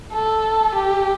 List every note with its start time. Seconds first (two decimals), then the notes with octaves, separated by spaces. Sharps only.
0.14 A4
0.75 G4